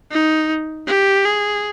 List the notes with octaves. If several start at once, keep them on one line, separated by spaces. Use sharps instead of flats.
D#4
G4
G#4